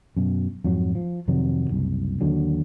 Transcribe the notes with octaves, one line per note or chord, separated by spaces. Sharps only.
F#2 B2
F2 G#2 F#3
F3
F2 C3 D#3 F#3
F#1 C2
D#2 D3 F#3